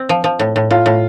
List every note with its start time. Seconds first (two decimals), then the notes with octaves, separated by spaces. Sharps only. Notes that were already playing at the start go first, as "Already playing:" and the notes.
Already playing: C4
0.09 F3
0.24 F3
0.39 A2
0.56 A2
0.71 A2 F4
0.86 A2